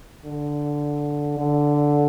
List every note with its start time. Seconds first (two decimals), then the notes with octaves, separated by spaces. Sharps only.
0.25 D3
1.38 D3